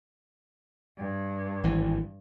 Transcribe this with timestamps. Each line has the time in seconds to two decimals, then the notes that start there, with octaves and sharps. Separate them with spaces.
0.98 G2
1.64 G#1 E3